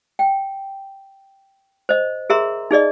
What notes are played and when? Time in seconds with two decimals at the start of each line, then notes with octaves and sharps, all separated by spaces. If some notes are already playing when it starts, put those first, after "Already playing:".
0.19 G5
1.89 C5 D#5
2.30 G#4 A#4 E5 A#5 C6
2.71 D#4 G#4 D5 D#5